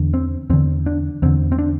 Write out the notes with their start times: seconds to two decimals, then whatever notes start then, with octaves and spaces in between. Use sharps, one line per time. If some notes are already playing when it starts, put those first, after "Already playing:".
Already playing: E2 D3
0.14 C4
0.50 E2 D3 C4
0.86 D4
1.22 E2 D3 C4
1.52 C4
1.59 D4